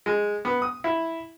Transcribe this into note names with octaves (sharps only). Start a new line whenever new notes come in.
G#3
B3
D#6
E4